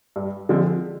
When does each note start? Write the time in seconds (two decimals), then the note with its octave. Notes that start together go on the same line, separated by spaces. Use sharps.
0.16 G2
0.49 D3 F3 G#3 C4